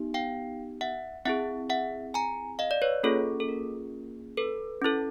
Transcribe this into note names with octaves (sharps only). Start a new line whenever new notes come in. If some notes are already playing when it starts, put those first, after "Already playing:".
Already playing: B3 D#4 G4
F5 G5
E5 F#5
C4 E4 G#4 E5 F#5
E5 F#5
G#5 A#5
D#5 F5
D5
B4 C#5
A#3 C#4 F4 G#4 A4
A4
A#4
A4 B4
C#4 E4 A4